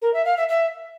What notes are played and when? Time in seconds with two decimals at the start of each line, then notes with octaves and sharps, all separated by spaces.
0.01 A#4
0.13 E5
0.25 F5
0.36 E5
0.48 E5